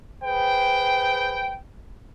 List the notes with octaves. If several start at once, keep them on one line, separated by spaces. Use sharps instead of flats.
G#4 B4 C5 G5